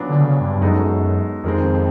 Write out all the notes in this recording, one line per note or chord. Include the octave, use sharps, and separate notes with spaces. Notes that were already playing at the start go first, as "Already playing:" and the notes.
Already playing: A#2 F#3 B3 D4
D3
C#3
G2
G2
F#2 G#3 B3 D#4 F#4 A4
F2 D#3 G#3 C4